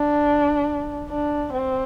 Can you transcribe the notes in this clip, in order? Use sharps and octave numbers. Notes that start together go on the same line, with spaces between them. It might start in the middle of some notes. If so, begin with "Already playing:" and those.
Already playing: D4
D4
C4